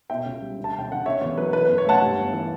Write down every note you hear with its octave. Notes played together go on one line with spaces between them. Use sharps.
B2 E5 G5
C#2
G3
D2
A5
E1 G5
D3 F#5
C#3 C#5 E5
E2 C#5
F#3 B4
E3 B4
F#2 B4
C#5
A3 F#5 A5
G2
G1
E3